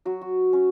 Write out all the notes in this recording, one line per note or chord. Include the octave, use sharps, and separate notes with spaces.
F#3 F#4
F#4
C#4